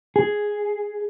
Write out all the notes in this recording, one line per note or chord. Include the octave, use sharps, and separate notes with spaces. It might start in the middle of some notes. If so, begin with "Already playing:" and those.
G#4